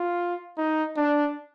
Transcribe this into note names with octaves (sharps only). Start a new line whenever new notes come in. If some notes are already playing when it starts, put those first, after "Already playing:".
Already playing: F4
D#4
D4